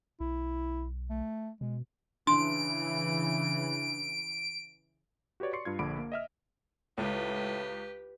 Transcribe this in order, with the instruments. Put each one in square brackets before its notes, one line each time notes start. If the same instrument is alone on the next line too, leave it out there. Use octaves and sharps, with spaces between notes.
[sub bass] B1 [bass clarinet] E4
[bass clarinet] A3
[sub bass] B2 [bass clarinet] G#3
[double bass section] C#3 E3 [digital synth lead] D4 [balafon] C6 [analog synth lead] D7
[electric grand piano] F#4 G4 B4 C#5 D5
D5 C6 C#6 C7 C#7
G2 F4 G#6
A#1 A#2 D3 B5 D6 D7
A#3
D#5 E5 F6
[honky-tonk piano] C#2 [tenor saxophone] A2 [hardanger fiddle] G4 B4